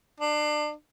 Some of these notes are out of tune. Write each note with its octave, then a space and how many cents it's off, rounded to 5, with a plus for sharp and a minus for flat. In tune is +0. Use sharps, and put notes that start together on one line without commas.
D4 +30